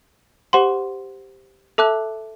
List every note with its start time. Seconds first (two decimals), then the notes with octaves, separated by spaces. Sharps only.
0.53 G4 C5 F#5 C6
1.78 A4 E5 A5 D6 F#6